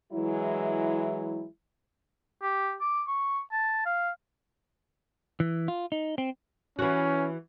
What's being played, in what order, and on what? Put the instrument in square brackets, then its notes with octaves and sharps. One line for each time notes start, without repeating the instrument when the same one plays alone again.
[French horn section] E3 F#3 G#3 E4
[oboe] G4
D6
C#6
A5
F5
[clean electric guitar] E3
F4
D#4
C4
[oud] E3 F#4 [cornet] C#4